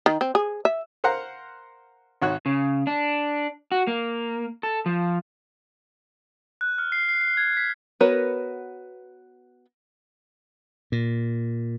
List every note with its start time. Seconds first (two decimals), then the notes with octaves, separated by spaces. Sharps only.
0.06 D#3
0.21 C4
0.35 G#4
0.65 E5
1.04 A#4 C5 F5 F#5 A#5
2.22 G#1 F#4 C#5 F#6
2.46 C#3
2.87 D4
3.72 F#4
3.87 A#3
4.63 A4
4.86 F3
6.61 F#6
6.78 F6
6.92 C7
7.09 C7
7.21 C7
7.37 G#6
7.57 B6
8.00 B3 F#4 A#4 B4 C#5
10.92 A#2